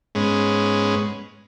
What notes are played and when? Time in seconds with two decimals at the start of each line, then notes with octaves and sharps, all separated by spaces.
0.15 G#2 G#3 B3 C#4